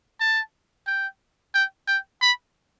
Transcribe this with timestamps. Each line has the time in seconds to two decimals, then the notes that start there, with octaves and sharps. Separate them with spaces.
0.20 A5
0.87 G5
1.54 G5
1.88 G5
2.22 B5